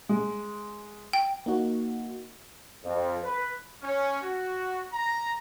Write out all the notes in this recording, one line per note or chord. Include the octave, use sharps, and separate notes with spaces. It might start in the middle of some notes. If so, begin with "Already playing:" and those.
G#3
G5
A#3 D#4 F#4
F2
B4
C#4
F#4
A#5